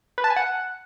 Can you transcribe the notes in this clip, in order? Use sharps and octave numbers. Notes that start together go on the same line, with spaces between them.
B4
A5
G#5
F#5